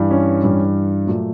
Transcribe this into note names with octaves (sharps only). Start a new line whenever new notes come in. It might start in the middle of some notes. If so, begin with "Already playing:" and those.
Already playing: G2 E3 G3
C#4
G2 E3 G3
A#2 F#3 A3